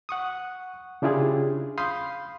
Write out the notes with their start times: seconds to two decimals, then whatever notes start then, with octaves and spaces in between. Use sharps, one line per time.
0.09 F#5 C#6 D#6
1.02 C#3 D4 E4 F4 G4 G#4
1.78 F5 B5 C6 D#6 G6